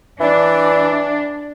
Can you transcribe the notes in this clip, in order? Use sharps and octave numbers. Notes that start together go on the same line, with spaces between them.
E3 D4